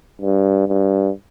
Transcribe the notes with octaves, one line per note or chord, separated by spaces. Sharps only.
G2
G2